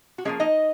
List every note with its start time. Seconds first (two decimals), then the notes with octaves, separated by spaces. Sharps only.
0.18 F#4
0.25 F3 G#3 A#3 C#4 G#4
0.40 D#4 D#5